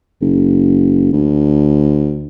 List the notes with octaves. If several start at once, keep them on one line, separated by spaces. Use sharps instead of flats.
F#1
D2